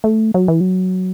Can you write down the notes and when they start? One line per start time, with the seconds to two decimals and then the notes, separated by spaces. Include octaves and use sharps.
0.04 A3
0.34 F#3
0.48 E3
0.60 F#3